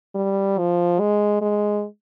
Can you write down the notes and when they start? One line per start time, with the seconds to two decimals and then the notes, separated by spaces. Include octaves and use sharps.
0.15 G3
0.58 F3
1.00 G#3
1.41 G#3